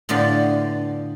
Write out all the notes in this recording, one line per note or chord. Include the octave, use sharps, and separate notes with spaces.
A2 D3 B3 F4 G4